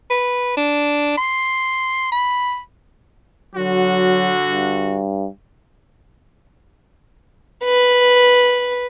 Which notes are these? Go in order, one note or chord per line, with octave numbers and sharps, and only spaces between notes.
B4
D4
C6
B5
D3 F#3 F#4
G2
B4